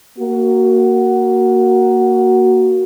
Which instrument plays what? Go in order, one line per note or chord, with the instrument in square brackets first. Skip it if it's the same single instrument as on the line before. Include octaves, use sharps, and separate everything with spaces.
[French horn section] A#3 F#4